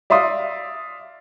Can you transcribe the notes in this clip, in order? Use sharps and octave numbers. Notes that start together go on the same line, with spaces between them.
D5 E5 F5 C6 D#6